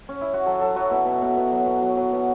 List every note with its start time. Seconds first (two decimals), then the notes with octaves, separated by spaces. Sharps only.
0.09 C#4
0.21 E4
0.34 F#4
0.46 F#3 A4
0.61 F#3 A4
0.76 F#3 F#4
0.91 B2 E4
1.06 B2
1.21 B2
1.37 B2
1.52 F#3
1.66 B2
1.82 F#3
1.97 F#3
2.13 B2